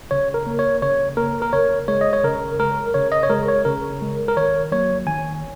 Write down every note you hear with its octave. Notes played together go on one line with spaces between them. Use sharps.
C#3 C#5
A#4
A#3
C#5
C#3 C#5
A#3 A#4
A#4
C#3 C#5
G#3 C#5
D#5
C#5
C#3 A#4
G#3 A#4
C#3 C#5
D#5
C#5
G#3 A#4
C#5
C#3 A#4
G#3
A#4
D#3 C#5
F#3 A#3 C#5
D#3 G#5